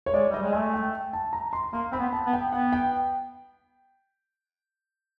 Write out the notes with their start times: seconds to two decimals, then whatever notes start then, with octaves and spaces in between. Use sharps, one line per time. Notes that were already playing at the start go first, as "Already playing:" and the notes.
0.06 C#5
0.13 G#3 D5
0.30 G3 D#5
0.42 G#3
0.53 A3 G#5
0.74 G5
1.13 A5
1.33 A#5
1.53 C6
1.73 A#3 C6
1.92 C4 B5
1.99 B3
2.13 A5
2.26 B3
2.33 G5
2.52 B3 F#5
2.73 G5